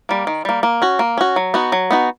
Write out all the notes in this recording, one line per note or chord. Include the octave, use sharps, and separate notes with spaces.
G3 A#3
D#3
G3 A#3
A#3
C#4 F#4
A#3
C#4 F#4
F#3
B3 D#4 F#4
F#3
B3 D#4 F#4